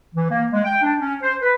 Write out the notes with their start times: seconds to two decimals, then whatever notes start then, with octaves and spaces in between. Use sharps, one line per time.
0.14 E3
0.30 A#3
0.52 G#3
0.65 G5
0.82 D4
1.01 C#4
1.22 C5
1.42 B4